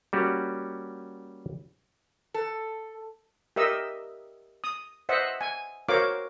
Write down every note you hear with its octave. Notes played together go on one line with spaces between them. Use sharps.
G3 A#3 C#4 F#4 G4
A4
G4 A#4 D#5 E5 E6
D#6
C5 D#5 E5 F#5
G#5
F#4 A#4 C5 C#5 F5 D6